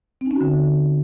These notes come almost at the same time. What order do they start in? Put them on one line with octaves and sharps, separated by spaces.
C4 D#4 C#4 F#4 D3